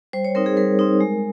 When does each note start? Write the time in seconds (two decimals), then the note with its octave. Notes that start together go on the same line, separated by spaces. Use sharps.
0.13 G3 C5
0.25 C#5
0.35 C4 D#4 A#4
0.46 G#4
0.57 G3 A#4
0.79 C4 D#4
1.01 G#3